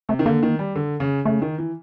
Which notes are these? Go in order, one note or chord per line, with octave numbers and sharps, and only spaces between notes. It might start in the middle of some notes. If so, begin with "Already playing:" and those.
C3 A3
D#3
D3 A#3
D#3
G3
D3
C#3
C#3 A3
D#3
E3